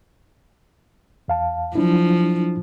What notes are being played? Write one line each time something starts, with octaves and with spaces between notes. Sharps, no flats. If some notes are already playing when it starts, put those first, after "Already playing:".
E2 F5 A5
F3 F#3 D4 E4